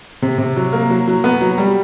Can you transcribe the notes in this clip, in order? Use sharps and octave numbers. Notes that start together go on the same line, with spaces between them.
C3
C3
F#3
A#3
F#3
F#3
B3
F#3
G3